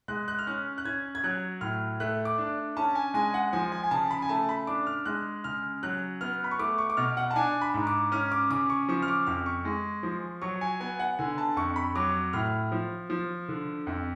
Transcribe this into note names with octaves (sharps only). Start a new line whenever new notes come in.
G#3 F#6
F#6
F6
C#4 F#6
F#6
C#4 G#6
G#6
F#3 F#6
A2 F6
A3 F#6
D6
D4
C#4 A5
G#5
G#3 G#5
F#5
F3 G#5
G#5
G#5
C#3 A5
B5
G#5
A3 A5
B5
D4 D6
F6
G#3 F#6
C#3 F6
F#3 F#6
B3 F6
B5
C#6
A3 D6
C#6
D6
B2 F6
F#5
A5
D4 G#5
B5
G#2
D6
C#4 F6
D6
C#3 D6
C#6
F3 C#6
F6
D6
F2 F6
C#6
G#3
F3
F#3 C#6
G#5
B3 G#5
F#5
D3 G#5
A5
F2 C#6
B5
F#3 D6
A2 F6
F3
F3
D3
F2